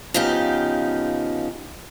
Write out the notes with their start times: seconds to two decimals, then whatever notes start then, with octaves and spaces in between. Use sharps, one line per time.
0.14 C#3 F3 B3 D#4 G4